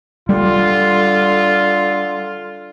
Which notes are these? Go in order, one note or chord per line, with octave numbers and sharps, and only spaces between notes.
D3 G3 F4